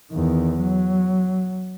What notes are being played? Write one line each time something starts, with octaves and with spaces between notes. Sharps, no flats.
E2 D#3
F#3